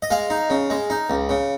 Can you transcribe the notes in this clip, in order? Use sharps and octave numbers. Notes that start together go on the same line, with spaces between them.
D#5
G#3 F5
D#4
C#3
G#3
D#4
C#2
C#3